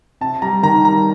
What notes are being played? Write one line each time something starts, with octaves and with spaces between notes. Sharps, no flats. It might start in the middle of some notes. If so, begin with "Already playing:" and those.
C3 A5
G3 A#5
D#3 A#5
G3 A#5